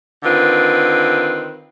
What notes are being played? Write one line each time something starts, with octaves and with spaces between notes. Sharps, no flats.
D3 D#3 C4 F4 B4